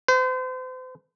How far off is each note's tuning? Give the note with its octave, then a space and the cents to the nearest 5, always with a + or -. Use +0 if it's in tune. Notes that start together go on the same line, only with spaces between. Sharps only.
C5 -40